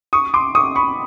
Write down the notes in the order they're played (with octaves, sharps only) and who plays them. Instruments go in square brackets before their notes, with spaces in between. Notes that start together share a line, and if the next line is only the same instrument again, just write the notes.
[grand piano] C#6 D#6
C6 D6
C#6 D#6
B5 C#6